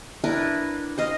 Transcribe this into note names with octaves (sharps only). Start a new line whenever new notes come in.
D4 E4 A#4 B4
C5 D#5 F5